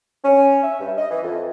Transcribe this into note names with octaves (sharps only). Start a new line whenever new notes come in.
C#4
E5
G2
D#5
E3
F2